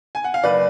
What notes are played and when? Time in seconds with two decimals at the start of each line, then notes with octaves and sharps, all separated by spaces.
0.15 G#5
0.24 F#5
0.34 F5
0.43 F#1 B4 D5